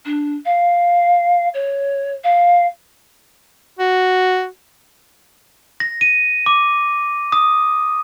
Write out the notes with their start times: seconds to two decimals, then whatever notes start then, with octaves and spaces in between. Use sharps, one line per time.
0.05 D4
0.45 F5
1.54 C#5
2.24 F5
3.79 F#4
5.80 A#6
6.01 D#7
6.46 D6
7.32 D#6